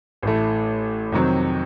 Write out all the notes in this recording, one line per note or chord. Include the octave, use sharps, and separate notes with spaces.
A1 A2 A3
F2 C3 D#3 F#3 C4